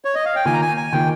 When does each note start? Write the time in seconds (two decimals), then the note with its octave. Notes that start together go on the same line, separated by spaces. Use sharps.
0.05 C#5
0.15 D#5
0.25 F5
0.35 G5
0.45 D#3 A#3 F4 G#5
0.53 A#5
0.62 G#5
0.77 G#5
0.92 D#3 A#3 F4 G5